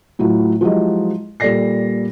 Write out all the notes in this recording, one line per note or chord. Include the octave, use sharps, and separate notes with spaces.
A2 F#3 E4 F4
F3 F#3 G#3 E4 G4 D#5
A#2 G3 A4 D5 A#6 C7